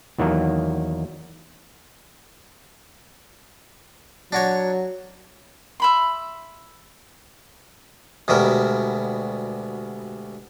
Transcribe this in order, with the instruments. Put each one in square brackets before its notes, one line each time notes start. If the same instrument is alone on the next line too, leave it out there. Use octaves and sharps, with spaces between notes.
[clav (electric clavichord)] E2 D#3 F#3 A#3
[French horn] F#3 [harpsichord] D4 F#4 C#5
[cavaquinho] E5 B5 C6
[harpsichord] D2 B2 G3 G#3 A#4